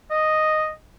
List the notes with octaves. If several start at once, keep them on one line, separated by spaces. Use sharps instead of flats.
D#5